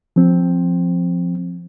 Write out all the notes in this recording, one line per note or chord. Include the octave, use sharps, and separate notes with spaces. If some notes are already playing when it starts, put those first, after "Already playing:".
F3 C4